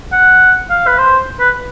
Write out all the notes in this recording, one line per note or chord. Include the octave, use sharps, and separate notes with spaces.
F#5
F5
B4
C5
B4